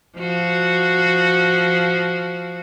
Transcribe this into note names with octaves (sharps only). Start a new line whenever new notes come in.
F3 F#4